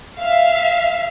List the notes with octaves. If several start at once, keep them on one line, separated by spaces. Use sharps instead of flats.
E5 F5